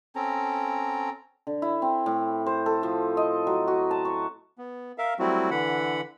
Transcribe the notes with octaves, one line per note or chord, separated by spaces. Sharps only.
C4 C#4 A4 A#5
D3
E4
C4
A2
C5
A4
F3
D#5
F#3
F#4
A5
C#6
B3
A#4 E5 F5
F#3 G3 A3 C4 E4 F#4
D3 E3 F#5 B5